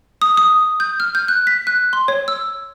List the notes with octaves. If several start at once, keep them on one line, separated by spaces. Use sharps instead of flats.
D#6
D#6
G6
F6
G6
F#6
B6
F#6
C6
C#5
E6